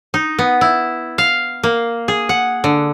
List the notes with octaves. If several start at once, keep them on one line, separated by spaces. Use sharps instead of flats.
D#4
B3
E4
F5
A#3
G#4
F#5
D3